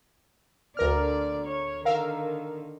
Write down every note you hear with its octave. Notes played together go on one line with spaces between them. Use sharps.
D2 D3 A#4 D5 F6
C#5
D3 D#3 A#4 F5 E6